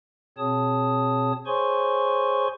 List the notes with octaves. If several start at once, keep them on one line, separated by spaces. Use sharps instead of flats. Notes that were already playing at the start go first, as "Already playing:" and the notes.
B2 C4 G#4 C#5 A5 D#6
G#4 C5 C#5 G#5 C6 C#6